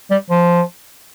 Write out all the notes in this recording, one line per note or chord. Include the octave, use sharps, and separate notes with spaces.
G3
F3